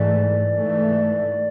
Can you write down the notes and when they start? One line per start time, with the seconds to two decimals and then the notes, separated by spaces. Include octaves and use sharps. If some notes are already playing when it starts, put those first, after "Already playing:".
Already playing: G#2 E3 A3 D5
0.53 G#2 E3 A3